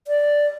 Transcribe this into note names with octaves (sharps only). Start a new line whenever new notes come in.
D5